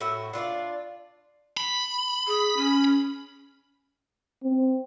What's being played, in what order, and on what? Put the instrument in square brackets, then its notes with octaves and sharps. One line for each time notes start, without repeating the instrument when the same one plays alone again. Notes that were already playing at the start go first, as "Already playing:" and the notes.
[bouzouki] A2 F#4 E5
D4 F4 A#4 D5
[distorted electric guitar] B5
[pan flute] G#4
C#4
[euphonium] C4